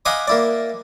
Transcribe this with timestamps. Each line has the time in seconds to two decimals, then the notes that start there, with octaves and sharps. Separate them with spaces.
0.05 D#5 F5 F#5 G#5 B5 D6
0.28 A#3 E4 D5